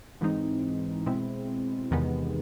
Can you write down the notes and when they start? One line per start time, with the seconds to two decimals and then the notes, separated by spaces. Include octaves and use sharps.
0.21 G#2 E3 G#3 C4 D#4
1.06 B2 G#3 C4 E4
1.91 E2 C3 D#3 G#3 B3